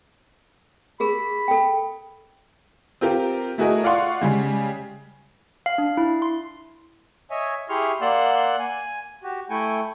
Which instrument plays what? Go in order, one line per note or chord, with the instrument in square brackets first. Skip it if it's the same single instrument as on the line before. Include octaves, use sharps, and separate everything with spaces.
[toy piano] G4 G#4 A#4 [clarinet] B5
[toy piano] A4 G5
[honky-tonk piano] C4 F4 G4 A#4
A3 E4 F#4 G#4 A#4 D#5
F4 D5 F5 F#5 C6 C#6
C#3 G3 G#3
[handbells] F5
D4
E4
C6
[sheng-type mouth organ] C#5 D#5 E5 G#5
E4 G4 G#4 C6 C#6 F6
A#3 D5 F#5 C6 E6 F#6
G#5
F#4 G4
A3 E4 G5 G#5 C#6